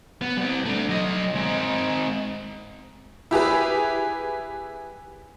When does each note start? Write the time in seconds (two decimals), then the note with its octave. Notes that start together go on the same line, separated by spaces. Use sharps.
0.22 B3
0.37 G3 C4
0.66 A3 D4
0.89 F#3 D#5
1.35 G#3 C4
3.31 E4 G4 G#4 B4